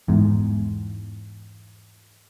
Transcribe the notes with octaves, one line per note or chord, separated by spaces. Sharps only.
E2 G#2